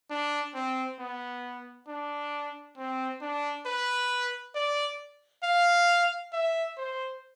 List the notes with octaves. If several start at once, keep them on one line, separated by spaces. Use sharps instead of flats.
D4
C4
B3
D4
C4
D4
B4
D5
F5
E5
C5